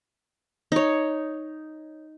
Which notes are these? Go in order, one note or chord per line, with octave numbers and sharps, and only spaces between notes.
D#4 C#5